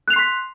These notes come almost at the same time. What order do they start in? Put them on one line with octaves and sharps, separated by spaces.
F#6 F7 C7 C6 B6